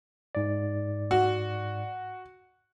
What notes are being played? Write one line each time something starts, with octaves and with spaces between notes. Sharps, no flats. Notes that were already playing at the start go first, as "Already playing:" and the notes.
G#2 D5
F#4